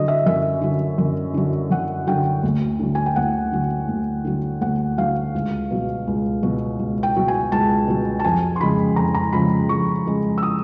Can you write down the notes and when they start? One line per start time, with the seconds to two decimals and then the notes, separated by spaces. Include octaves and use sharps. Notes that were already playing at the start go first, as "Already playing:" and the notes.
Already playing: D3 F#3 D#5
0.08 E5
0.26 F#2 E5
0.62 D3 F#3
0.98 F#2
1.34 D3 F#3
1.70 F#2 F#5
2.07 D3 F#3 G5
2.43 D2
2.79 D3 F#3
2.95 G#5
3.06 G5
3.16 D2 F#5
3.52 D3 F#3
3.88 D2
4.25 D3 F#3
4.61 D2 F#5
4.98 D3 F#3 F5
5.34 C#2
5.71 B2 F#3
6.07 C#2
6.43 B2 F#3
6.79 C#2
7.03 G5
7.16 B2 F#3
7.28 G#5
7.52 C#2 A5
7.88 B2 F#3
8.20 A5
8.24 F2 G#5
8.56 C6
8.60 C#3 F3 G#3 B5
8.96 F2 A#5
9.15 A#5
9.33 C#3 F3 G#3 B5
9.69 F2 C#6
10.06 C#3 F3 G#3
10.38 E6
10.43 D#6